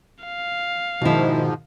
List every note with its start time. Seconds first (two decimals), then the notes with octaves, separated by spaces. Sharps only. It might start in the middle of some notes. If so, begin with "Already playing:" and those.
0.25 F5
1.01 G#2 B2 D#3 F3 D#4 E4